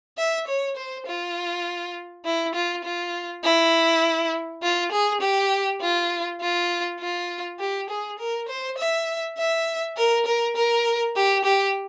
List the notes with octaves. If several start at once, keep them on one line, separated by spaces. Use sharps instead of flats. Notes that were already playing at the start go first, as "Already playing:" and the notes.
E5
C#5
C5
F4
E4
F4
F4
E4
F4
G#4
G4
F4
F4
F4
G4
G#4
A#4
C5
E5
E5
A#4
A#4
A#4
G4
G4